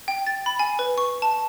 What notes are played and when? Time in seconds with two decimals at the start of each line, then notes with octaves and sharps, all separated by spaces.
0.08 G5
0.27 A6
0.46 B5
0.59 G#5
0.79 B4
0.98 C#6
1.22 A5